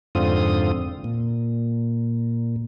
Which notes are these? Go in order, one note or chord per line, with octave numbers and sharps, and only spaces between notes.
F2 G#2 D3 C4 F4 D#6
A#2